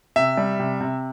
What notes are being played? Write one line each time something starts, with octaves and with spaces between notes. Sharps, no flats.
C3 E5
G3
C3
C3